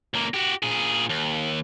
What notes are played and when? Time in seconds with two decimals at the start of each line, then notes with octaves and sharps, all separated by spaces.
0.14 C#2 A#3
0.34 F#4 G4
0.63 A#2 G#4
1.09 D#2